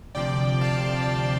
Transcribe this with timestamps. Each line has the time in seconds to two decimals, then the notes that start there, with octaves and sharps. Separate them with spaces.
0.15 D2 C3 F3 D5 G5
0.61 F5 A5